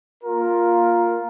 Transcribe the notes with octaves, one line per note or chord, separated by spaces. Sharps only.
A#3 F4 A#4